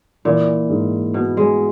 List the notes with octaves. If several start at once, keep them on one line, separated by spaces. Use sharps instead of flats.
A#2 E3
G#2
B2 B3
G#3